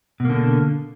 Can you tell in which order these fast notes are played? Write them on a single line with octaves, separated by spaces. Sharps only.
B2 A#3 D3